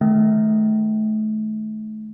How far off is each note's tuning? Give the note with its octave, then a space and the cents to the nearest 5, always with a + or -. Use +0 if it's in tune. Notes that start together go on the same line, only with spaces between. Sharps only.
D#3 -10 A3 -30